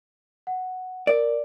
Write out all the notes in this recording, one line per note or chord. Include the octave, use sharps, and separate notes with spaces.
F#5
A#4 D5